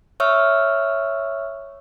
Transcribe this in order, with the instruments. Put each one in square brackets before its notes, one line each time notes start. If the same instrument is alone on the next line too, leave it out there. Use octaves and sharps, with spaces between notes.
[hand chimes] C#5 E5 C#6 E6 F6